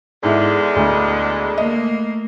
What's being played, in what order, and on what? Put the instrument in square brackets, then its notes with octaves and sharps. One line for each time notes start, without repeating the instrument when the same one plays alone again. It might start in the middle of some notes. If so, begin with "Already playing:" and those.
[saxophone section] E2 D3 G#3 [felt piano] G#2 E4
[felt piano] D2
[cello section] A3 A#3 [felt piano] D#5